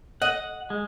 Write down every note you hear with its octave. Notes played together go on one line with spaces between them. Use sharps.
D#5 F#5
G#3